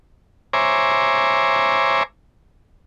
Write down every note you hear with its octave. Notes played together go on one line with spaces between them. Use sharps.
C5 C#5 E5 G#5 A#5 D6